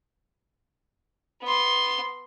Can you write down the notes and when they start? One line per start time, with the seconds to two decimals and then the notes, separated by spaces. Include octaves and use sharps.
1.42 B3 C6